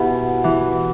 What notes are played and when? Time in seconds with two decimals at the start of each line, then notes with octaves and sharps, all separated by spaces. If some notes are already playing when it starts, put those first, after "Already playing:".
Already playing: B2 E4 G4 B4 E5 B5
0.44 E3